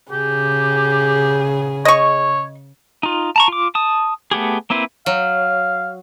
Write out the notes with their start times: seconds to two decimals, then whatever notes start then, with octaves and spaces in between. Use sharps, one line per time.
0.11 C#3 G4 G#4
1.85 C#5 D#5 C#6
3.03 D#4 F4
3.36 A5 A#5 C#6
3.48 F4 D6
3.75 A5 D#6
4.31 A3 B3 G4 G#4
4.70 A#3 C4 E4 B4 C5
5.06 F#3 F5